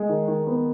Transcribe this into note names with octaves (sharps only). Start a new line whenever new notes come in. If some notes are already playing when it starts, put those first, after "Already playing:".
Already playing: G#3
D#3
D#3
B3